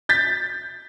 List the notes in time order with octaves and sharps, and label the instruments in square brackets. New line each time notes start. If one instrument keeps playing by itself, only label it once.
[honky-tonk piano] G6 A6 B6